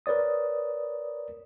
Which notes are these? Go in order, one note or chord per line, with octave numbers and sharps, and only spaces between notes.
A#4 B4 C#5 D5 D#6